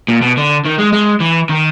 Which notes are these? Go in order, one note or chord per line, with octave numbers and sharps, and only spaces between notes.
A#2
B2
D3
D#3
G#3
G#3
E3
D#3